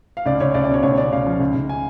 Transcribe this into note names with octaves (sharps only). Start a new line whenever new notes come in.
F5
C#2 D5
C#2 C#5
C#2 D5
D5
B2 C#5
C#2 C#5
C#3 D5
C#2 F5
F3
C#2
C#2
G#5